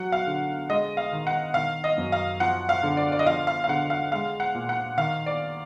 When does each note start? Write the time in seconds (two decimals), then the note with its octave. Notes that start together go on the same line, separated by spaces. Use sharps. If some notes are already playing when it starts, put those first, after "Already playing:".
Already playing: F#3 F#5
0.12 F5
0.27 D3
0.69 G#3 D#5
0.97 F5
1.12 D#3
1.27 F#5
1.54 D#3 F5
1.84 D#5
1.98 F#2
2.12 F5
2.40 F3 F#5
2.69 F5
2.83 D3
2.97 D5
3.12 D5
3.19 D#5
3.26 F3 F5
3.47 F5
3.64 F5
3.69 D3 F#5
3.90 F5
4.12 G#3 F5
4.40 F#5
4.54 A#2
4.69 F#5
4.97 D#3 F5
5.26 D5